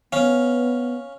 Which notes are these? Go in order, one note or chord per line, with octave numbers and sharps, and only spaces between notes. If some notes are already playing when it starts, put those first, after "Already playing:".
B3 C#4 F5